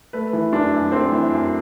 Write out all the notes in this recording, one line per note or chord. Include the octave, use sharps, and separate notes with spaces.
A3 B4
E3
F#2 D4
F#2
A3 C4
E3
F#2